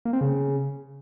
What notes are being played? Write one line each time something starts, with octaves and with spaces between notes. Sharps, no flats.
A#3
C4
C#3